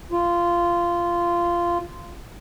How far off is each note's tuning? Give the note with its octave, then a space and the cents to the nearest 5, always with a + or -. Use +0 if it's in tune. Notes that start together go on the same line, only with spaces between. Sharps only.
F4 -15